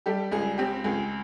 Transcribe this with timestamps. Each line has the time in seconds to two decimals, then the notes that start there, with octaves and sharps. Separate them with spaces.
0.06 G3 G4 A4
0.32 C#2 G#4
0.58 C4 G4
0.84 C#2 G#4